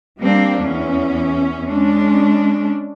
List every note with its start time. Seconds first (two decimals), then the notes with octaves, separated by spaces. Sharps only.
0.21 G3 A#3 C4 D4
0.61 E2 C#4
1.69 G#3 C#4 D4